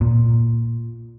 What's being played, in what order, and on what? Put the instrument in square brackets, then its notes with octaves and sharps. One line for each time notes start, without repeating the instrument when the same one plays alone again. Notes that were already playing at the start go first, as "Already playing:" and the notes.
[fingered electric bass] A#2